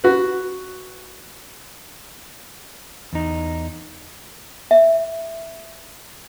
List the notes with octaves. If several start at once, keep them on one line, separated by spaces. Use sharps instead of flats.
F#4 B4
E2 D#4
E5